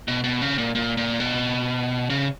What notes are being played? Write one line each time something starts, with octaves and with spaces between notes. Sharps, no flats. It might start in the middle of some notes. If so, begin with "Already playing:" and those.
B2
B2
C#3
A#2
A#2
A#2
B2
C#3